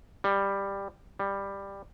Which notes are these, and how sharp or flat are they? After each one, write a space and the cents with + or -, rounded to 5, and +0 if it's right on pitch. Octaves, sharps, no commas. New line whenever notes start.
G3 +10
G3 +10